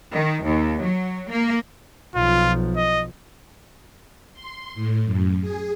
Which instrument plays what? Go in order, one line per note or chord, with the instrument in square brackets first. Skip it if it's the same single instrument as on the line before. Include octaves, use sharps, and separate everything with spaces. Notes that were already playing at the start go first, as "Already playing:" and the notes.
[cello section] D#3
D#2
F#3
A#3
[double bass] B1 F3 [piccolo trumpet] F4
[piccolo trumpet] D#5
[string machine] C6
A2
F#2
G#4